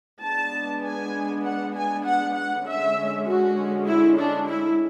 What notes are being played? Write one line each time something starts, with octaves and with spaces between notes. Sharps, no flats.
G#3 B3 D4 A5
G#5
F#5
G#5
F#5
F#5
D3 G#3 C#4 E5
F#4
E4
D4
E4